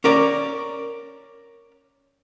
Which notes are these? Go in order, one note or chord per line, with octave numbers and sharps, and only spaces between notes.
C#4 A#4 D5